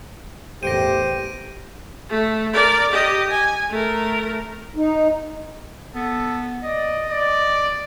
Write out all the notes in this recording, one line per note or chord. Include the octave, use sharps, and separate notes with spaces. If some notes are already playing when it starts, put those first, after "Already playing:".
A1 E2 G4 C5 A#6 D7 D#7
A3
A#4 D5
G4 D#5
G#5
A3 A#4
D#4
B3 A4
D5 D#5
D5